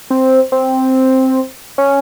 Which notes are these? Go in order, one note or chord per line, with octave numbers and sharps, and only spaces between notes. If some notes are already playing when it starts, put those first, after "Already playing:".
C4
C4
C#4